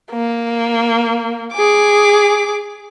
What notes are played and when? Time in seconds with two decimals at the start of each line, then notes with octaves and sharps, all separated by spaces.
0.12 A#3
1.53 G#4 D6